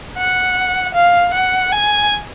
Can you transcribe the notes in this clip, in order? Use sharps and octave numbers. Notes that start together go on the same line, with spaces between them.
F#5
F5
F#5
G#5